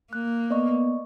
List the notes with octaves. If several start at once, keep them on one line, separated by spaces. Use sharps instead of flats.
A#3 F#6
B3 D5 D#5 C#6